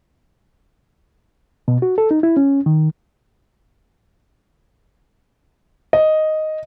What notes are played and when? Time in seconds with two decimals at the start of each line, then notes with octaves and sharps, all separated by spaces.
1.68 B2
1.82 F#4
1.98 A4
2.11 D#4
2.23 E4
2.37 C#4
2.66 D#3
5.93 D#5